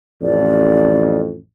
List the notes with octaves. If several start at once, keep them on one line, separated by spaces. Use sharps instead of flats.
A1 F2 D5